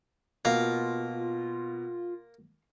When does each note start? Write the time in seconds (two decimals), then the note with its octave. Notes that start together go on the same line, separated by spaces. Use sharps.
0.45 B2 A#3 F4 F5